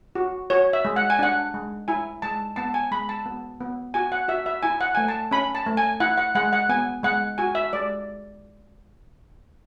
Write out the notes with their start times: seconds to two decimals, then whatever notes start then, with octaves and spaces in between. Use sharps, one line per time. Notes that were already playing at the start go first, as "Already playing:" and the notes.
0.15 F#4
0.50 F#4 C#5
0.73 E5
0.85 G#3
0.96 F#5
1.10 G#5
1.19 D4 F#5
1.54 G#3
1.88 E4 G#5
2.22 G#3 A5
2.56 B3 A5
2.74 G#5
2.91 G#3 B5
3.09 A5
3.26 B3
3.61 B3
3.94 F#4 G#5
4.12 F#5
4.28 F#4 E5
4.46 E5
4.63 E4 G#5
4.81 F#5
4.95 A3 G#5
5.08 A5
5.31 C#4 B5
5.55 A5
5.66 A3
5.77 G#5
6.00 E4 F#5
6.18 F#5
6.35 G#3 F#5
6.53 F#5
6.69 B3 G#5
7.03 G#3 F#5
7.38 F#4 G#5
7.55 E5
7.73 G#3 D5